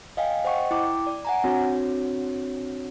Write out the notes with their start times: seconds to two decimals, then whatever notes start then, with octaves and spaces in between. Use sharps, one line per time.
0.17 D#5 F5 G5 G#5
0.45 C5 D#5 F#5 G5 C#6
0.71 E4 G5 D6
1.07 D5
1.25 F#5 G#5 A#5
1.44 C4 D4 F#4 C#5